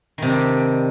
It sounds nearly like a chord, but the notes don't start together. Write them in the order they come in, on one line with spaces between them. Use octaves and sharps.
D#3 C3 D4 G3